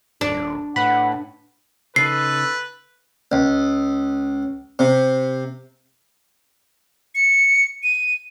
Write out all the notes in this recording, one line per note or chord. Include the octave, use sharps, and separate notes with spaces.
D#1 D4
A2 B4 F#5 B5
C#3 D#4 A4 B4 C7
C#2
C3
C#7
D#7